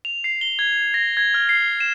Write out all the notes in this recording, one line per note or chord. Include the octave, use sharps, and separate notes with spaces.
F7
C7
G7
G#6
A#6
G#6
F6
C7
E7